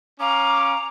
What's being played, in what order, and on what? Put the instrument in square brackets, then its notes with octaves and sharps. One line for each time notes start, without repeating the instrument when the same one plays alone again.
[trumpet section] C#4 F5 D6 [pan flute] A#5